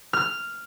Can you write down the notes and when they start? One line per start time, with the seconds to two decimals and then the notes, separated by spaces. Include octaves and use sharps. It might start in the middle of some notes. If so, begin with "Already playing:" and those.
0.13 F6